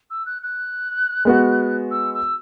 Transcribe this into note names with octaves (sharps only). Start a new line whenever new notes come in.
E6
F#6
F#6
G#3 B3 F#4
E6
E6